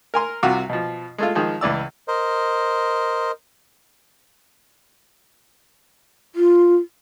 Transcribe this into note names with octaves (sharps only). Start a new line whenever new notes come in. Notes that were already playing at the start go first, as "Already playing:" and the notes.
A#4 G#5 C6
C2 C3 F4 F#4 D6
B2 F3
G#3 A3 F4
D#3 F3 G#3
C#2 E3 D5 E6
A#4 C5 D#5
F4